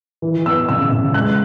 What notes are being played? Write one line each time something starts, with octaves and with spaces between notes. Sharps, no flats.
E3
B3 E6
C#3 E6
C#3
G#3 F#6